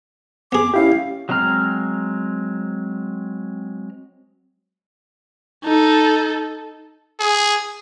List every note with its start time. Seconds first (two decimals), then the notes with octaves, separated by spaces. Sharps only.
0.52 B3 G#4 D6
0.74 C#4 E4 G4 F5
1.29 F#3 G#3 C4 A#5 F6
5.64 D#4 A4
7.20 G#4